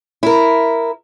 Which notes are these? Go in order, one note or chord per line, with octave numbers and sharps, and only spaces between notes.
E4 A#4